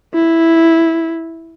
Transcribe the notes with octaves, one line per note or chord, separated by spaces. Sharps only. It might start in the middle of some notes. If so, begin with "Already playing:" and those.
E4